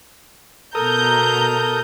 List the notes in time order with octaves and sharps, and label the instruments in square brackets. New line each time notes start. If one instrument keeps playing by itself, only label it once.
[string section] B2 A#5 G6 [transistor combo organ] A4 A#4 D#6